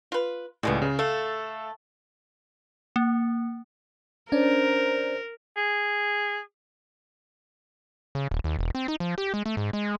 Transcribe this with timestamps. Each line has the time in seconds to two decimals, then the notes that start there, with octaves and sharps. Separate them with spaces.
0.12 F4 B4
0.63 C#2 A2 G3 G#3 B3
0.82 C#3
0.99 A3 A4 F5
2.96 A#3
4.32 C#4 D4 A#4 C5 D5
5.57 G#4
8.15 C#3
8.31 D#1
8.44 D#2
8.59 E1
8.75 C4
8.88 D#4
9.00 F3
9.18 G4
9.34 G#3
9.46 A3
9.57 G#2
9.73 G#3